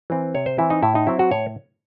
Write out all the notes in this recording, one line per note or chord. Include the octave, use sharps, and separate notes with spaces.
E3 C4
C3 C#5
C5
E3 C4 E4
D#4
A2 E4
D#4
F#3 C4 E4
F#4
A2 C#5